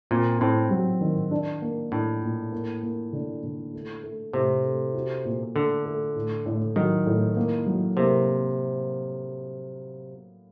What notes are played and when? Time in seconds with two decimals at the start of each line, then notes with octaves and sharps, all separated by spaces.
0.11 A#2 C4
0.41 A2 C4
0.71 F#3
1.01 D#3
1.31 D4
1.62 A#3
1.92 A2 D4
2.22 A#2
2.52 A#3
2.83 A#3
3.13 D3
3.43 D3
3.73 A3
4.03 A3
4.33 A2 C3
4.64 A3
4.95 F#4
5.25 A#2
5.55 D3 A3
5.85 A3
6.15 A2
6.46 A2
6.76 D#3 F#3
7.06 A2
7.37 A#3
7.67 F#3
7.97 C3 A#3